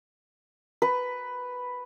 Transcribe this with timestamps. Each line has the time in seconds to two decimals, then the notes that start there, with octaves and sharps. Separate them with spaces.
0.82 B4